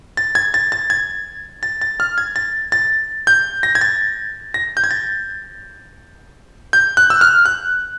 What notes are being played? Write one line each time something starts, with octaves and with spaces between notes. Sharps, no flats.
A6
G#6
A6
A6
G#6
A6
A6
F6
G#6
A6
A6
G6
A#6
G#6
A6
A#6
G6
G#6
A6
G6
F#6
E6
F6
F#6